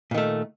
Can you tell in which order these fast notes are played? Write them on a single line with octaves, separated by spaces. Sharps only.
A#2 D#3 A3